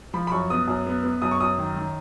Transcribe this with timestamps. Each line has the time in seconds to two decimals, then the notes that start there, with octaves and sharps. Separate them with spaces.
0.14 F3 B5
0.27 B5
0.32 F#2 C#6
0.50 B3 D#6
0.68 F#2
0.87 B3
1.04 B3
1.22 F#2 D#6
1.31 C#6
1.40 F#2 D#6
1.58 D#3
1.76 D#3